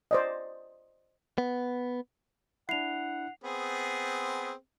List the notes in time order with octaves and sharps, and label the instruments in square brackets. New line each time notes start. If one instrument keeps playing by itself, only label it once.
[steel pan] C5 D5 D#5
[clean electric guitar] B3
[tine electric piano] D4 E4 [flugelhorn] F#5 [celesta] C7 F7
[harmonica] B3 C4 G#4